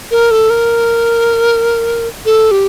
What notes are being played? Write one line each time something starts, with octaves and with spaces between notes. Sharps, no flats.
A#4
A4
A#4
A4
G4